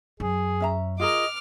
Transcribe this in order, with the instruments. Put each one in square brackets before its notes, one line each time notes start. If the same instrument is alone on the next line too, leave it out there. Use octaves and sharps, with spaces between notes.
[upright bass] F#2 [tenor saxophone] G#4
[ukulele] C#4 E5 A#5
[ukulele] F4 G#4 A#4 [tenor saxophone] D#5 [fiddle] D6 F6